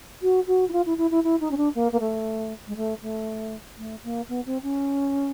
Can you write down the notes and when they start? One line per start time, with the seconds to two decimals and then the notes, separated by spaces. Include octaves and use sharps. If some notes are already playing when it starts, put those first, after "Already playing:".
0.22 F#4
0.47 F#4
0.69 E4
0.72 F4
0.86 E4
0.98 E4
1.11 E4
1.24 E4
1.40 D#4
1.51 C#4
1.57 D4
1.75 A#3
1.92 A#3
2.00 A3
2.67 G#3
2.76 A3
3.02 A3
3.78 A3
4.04 A#3
4.29 B3
4.46 C4
4.63 C#4